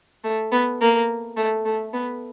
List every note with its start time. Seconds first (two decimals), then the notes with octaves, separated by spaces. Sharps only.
0.24 A3
0.52 B3
0.81 A#3
1.37 A3
1.65 A3
1.93 B3